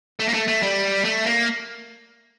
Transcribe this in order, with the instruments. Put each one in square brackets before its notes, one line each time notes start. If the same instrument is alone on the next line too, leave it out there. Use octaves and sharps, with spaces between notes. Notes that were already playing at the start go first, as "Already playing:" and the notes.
[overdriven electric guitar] A3
A#3
A3
A3
G3
A3
A#3